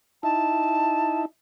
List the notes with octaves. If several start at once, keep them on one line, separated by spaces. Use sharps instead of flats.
D#4 E4 A5